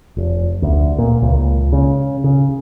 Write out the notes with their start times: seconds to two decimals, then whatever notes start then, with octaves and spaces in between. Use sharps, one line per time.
0.17 F1
0.62 D2
0.98 A#2
1.22 C#2
1.73 C#3
2.24 C#3